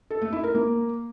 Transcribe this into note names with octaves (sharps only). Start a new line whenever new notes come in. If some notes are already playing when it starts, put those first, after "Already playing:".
A4
A3
E4
A#4
A#3